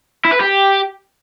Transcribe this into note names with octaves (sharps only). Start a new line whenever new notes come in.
E4
B4
G4